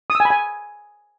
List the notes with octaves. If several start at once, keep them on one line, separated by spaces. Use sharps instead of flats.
D#6
E6
G#5
B5
G#5